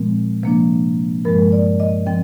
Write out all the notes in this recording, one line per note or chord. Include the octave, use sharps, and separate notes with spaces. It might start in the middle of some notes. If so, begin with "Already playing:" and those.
Already playing: A#2 F3 G#3 C4
C3 F3 A#3 D4
G2 F3 G#3 A#4
D5
D#5
F3 C4 G5